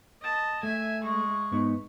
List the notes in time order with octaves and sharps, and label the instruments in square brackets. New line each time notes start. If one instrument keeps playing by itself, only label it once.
[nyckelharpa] D#5 A5
[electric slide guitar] A3 [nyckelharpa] E5 G#5
[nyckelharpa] G#3 C#6
[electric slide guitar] G#2 B3 D#4